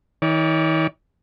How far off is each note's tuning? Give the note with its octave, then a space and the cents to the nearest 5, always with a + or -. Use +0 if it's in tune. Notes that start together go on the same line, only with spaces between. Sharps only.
D#3 +45 C#5 +45 D6 +0